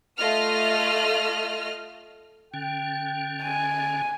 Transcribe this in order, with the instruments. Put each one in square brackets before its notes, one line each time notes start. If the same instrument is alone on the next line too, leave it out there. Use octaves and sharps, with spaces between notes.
[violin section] A3 F4 D#5 F6
[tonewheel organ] D3 C#4 [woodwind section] G5
[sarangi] G#5